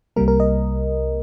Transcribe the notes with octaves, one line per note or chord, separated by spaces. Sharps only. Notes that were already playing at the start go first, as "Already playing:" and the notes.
C2 C3 G3 A#3 A#4
A#4
D#5